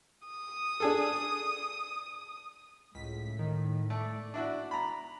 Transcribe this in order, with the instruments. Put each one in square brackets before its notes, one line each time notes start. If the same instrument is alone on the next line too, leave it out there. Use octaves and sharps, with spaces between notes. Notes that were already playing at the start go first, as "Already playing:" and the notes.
[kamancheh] D#6
[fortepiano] D4 G#4 A4
[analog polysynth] C#2 B6 [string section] A2
[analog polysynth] D#3
[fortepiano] A3 [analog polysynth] D5
[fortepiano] D4 E4 F#4
A#5 B5